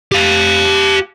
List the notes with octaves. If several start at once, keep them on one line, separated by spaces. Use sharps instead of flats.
G4 F5